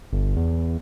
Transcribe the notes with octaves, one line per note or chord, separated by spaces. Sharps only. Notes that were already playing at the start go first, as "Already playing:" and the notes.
G1
E2